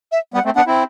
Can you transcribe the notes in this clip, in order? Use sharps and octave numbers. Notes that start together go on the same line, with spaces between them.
E5
G3 B3 F#5
A3 C4
B3 D4 F#5
C4 E4